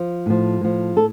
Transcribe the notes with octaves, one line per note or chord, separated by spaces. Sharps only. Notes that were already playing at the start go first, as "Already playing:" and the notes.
Already playing: F3
A2 F3
A2 F3
A2 A4